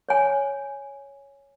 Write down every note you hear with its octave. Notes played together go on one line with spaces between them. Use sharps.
C#5 G#5